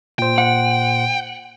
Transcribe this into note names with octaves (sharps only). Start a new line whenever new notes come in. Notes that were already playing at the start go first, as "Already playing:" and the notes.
A#2 C5 G5
F#5